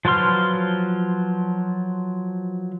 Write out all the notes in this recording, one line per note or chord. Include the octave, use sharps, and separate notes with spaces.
F3 F#3 B4 C6 F6